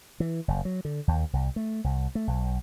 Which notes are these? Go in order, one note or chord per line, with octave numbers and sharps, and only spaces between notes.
E3
F#1
F#3
D3
D#2
C2
A3
C2
A3
B1